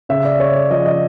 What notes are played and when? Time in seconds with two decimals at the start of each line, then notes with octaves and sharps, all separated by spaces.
0.09 C#3 E5
0.25 D5
0.40 C#3 C#5
0.55 D5
0.70 F3 D#5
0.86 D#5